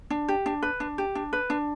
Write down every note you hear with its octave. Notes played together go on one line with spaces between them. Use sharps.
D4
G4
D4
B4
D4
G4
D4
B4
D4